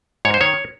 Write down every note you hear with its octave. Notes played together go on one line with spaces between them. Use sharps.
G#2 C#5
C5
D#3 C#5